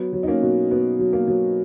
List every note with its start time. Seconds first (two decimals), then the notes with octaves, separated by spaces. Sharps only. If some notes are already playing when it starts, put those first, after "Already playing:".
Already playing: F#3 B3
0.13 F#3
0.23 D#4
0.27 A#3 C#4
0.42 B2
0.71 B2 B3
0.99 F#3
1.13 A#3
1.27 F#3